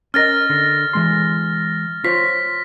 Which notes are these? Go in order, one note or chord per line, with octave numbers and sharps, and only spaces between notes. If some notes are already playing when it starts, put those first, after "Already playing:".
C#4 A#4 D#5 F6 A6 A#6
D3
E3 G#3 C6
F4 C5 C#5 B6